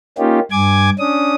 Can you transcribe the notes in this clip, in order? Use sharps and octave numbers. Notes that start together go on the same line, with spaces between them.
A#3 C#4 D#4 F4 G4
G2 G#5 D6 G#6
C#4 D4 D#6